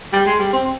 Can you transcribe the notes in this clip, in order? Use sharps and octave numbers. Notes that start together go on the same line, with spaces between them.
G3
G#3
G3
C4